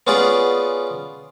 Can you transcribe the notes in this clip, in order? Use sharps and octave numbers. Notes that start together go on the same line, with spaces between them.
B3 C#4 F4 G#4 D5